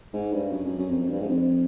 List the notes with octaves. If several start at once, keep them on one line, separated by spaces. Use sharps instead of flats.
G#2
G2
F#2
F#2
F#2
F2
F2
G2
G#2
F2